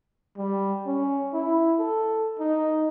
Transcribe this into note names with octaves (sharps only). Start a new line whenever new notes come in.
G3
C#4
E4
A4
D#4